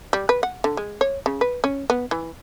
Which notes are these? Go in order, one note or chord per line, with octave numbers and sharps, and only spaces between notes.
G3
B4
F#5
D3
G#3
C#5
C#3
B4
C#4
B3
E3